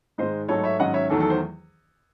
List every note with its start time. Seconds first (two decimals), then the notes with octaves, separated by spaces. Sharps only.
0.18 G#2 D#3 G#3 C5 D#5
0.49 G#2 F#3 A3 D#4 A4 C#5
0.63 C#5 E5
0.79 G#2 D#3 F#3 C#4 D#5 F#5
0.94 C#5 E5
1.10 E2 D#3 F#3 A3 A4
1.20 A4
1.30 C5